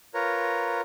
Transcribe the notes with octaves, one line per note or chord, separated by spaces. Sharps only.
F4 A#4 B4 C#5 A#5